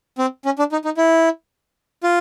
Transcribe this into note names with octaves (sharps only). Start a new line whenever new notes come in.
C4
C#4
D4
D#4
D#4
E4
F4